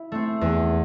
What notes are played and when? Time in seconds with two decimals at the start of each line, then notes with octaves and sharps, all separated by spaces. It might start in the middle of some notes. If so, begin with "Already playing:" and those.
Already playing: E4
0.12 A3 C4
0.41 E2